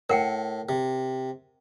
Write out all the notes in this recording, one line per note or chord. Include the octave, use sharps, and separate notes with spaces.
A2 A#4 F#5 G5
C3